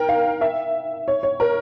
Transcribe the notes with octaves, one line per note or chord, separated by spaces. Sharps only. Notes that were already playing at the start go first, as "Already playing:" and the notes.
Already playing: A#4 G5
F5
E5
C#5
C#5
A#4